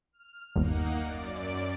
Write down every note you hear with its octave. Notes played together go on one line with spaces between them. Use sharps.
F6
G1 D#2 A#3 D#4 F#5
F#2 D5 D7